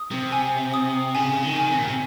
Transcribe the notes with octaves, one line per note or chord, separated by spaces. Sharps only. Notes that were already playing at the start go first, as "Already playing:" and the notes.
Already playing: D#6
C3
G#5
D#6
C#3 G#5
D#3
G#5
C3
A#2
C3